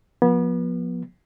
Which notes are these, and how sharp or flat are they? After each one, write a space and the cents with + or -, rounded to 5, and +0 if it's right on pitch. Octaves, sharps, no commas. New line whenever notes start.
F3 +30 B3 -30